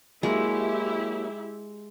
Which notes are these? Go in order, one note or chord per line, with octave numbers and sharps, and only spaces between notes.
F#3 G#3 A#3 E4 G4 E5